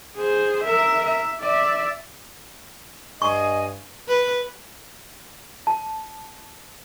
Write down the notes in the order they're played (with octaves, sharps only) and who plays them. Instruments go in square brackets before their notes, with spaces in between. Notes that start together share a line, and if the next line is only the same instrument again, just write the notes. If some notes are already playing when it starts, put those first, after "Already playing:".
[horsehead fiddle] G#4 C5
A#4 E5
E5
D5 E5
[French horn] G2 [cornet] D#5 [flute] G#5 [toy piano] C#6
[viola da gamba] B4
[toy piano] A5